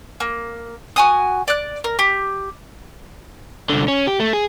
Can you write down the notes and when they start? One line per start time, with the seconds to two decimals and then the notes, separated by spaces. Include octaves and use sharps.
0.20 A#3
0.96 F#4 G#5 D#6
1.48 D5 F#6
1.84 A#4
1.99 G4
3.70 C2 D3
3.88 C#4
4.07 G4
4.20 A3
4.33 G#4